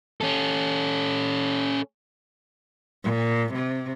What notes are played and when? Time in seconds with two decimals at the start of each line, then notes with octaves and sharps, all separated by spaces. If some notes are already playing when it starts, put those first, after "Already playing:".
0.21 C#4 A4
3.04 A#2
3.54 C3